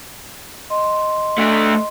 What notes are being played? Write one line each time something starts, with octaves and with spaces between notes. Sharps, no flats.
D#5 C6
A3 D4